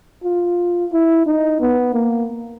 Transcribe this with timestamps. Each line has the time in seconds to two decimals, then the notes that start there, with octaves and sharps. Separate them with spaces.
0.24 F4
0.92 E4
1.26 D#4
1.61 B3
1.94 A#3